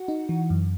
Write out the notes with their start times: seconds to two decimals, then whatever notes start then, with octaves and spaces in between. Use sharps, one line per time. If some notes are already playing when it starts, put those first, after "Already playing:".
Already playing: F#4 F#5
0.08 D#4
0.29 E3
0.50 F#2